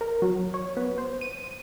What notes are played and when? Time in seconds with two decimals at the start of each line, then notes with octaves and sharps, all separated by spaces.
0.01 A#4
0.22 F#3
0.54 C#5
0.77 B3
0.98 C5
1.21 D#7